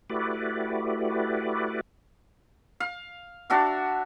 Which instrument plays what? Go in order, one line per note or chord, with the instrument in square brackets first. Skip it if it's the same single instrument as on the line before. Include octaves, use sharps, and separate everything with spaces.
[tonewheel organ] A3 E4 F#4 G4 B4 D5
[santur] F5
D4 F#4 E5 F5